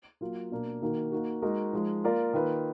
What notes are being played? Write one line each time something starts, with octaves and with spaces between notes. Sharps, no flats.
F#3 A#3 F4
B2 A#3 D4
D#3 A#3 D#4 F#4 A#4
A#3 D#4 F#4
G#3 D#4 F#4 A#4 D#5
F3 G#3 D#4
A#3 F4 A#4 D5
D#3 A#3 F4 B4